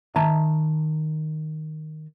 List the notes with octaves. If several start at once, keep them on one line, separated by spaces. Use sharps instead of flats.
D#3 E5 A5 A#5